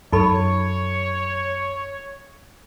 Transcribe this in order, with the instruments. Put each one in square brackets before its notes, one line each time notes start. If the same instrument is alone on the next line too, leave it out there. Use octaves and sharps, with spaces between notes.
[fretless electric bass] F#2 [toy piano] D#4 A4 B5 [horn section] C#5